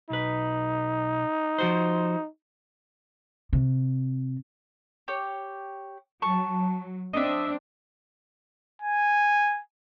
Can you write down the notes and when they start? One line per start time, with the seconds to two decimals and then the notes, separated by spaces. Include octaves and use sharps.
0.10 B1 D#4 B4
1.59 F3 F#4 C5
3.53 C3
5.08 G4 C#5
6.22 F#3 A5 C#6
7.13 C4 D4 D#5 E5
8.82 G#5